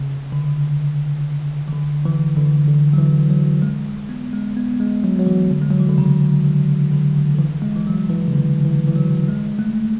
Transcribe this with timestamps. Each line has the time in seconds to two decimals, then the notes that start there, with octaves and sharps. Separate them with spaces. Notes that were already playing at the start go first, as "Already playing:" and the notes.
Already playing: C#3
0.32 D3
1.68 E3
1.73 D3
2.05 E3
2.37 D3
2.67 D3
2.93 F#3
2.98 E3
3.30 F#3
3.62 G#3
4.09 B3
4.33 G#3
4.57 B3
4.80 G#3
5.04 F#3
5.19 F#3
5.27 E3
5.51 D3
5.62 G#3
5.70 F#3
5.80 E3
5.89 D3
5.98 C#3
6.45 D3
6.91 D3
7.35 D3
7.39 E3
7.62 G#3
7.76 E3
7.87 F#3
8.10 E3
8.28 C#3
8.33 D3
8.65 E3
8.87 E3
8.96 F#3
9.28 G#3
9.59 A3